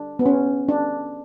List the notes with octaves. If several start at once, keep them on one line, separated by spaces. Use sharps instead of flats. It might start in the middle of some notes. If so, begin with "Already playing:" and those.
Already playing: D4
B3
C#4
D4